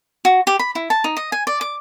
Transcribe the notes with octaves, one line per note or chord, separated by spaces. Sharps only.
F#4
G4
B5
E4
A5
D#4
D#5
G#5
D5
D6